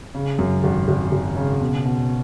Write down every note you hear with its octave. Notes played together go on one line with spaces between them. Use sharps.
C#3
F#2
G#1
G#1
G#1
C#3
B2
B2